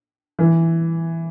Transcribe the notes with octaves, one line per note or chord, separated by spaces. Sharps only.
E3